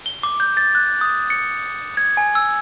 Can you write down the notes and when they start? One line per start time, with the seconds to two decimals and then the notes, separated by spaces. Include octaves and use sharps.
0.06 G7
0.23 D6
0.40 G6
0.57 A6
0.75 F#6
1.01 D#6
1.30 C#7
1.97 G#6
2.17 G#5
2.35 E6